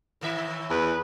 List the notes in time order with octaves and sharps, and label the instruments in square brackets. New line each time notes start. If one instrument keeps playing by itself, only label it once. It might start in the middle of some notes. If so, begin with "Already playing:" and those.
[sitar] A2 D#3 E5
[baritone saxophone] E2 [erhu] B4